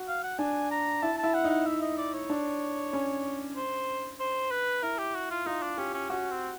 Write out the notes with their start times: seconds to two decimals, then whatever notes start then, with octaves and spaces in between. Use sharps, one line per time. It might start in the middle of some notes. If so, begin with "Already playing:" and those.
Already playing: F#4
0.08 F5
0.23 F#5
0.39 D4 G#5
0.71 A#5
1.02 E4 A5
1.18 E4 A5
1.34 F#5
1.44 D#4
1.50 F#5
1.66 E5
1.82 D#5
1.98 D5
2.14 C#5
2.29 D4
2.93 C#4
3.56 C5
4.20 C5
4.51 B4
4.82 E4 A#4
4.98 G4
5.15 F#4
5.30 F4
5.46 D#4 F4
5.62 D4
5.77 C#4 G4
5.94 C#4
6.10 C#4 F#4
6.31 C4